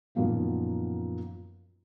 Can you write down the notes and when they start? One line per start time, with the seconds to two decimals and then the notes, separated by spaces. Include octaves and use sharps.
0.15 F#2 A#2 D#3 F3 A#3 B3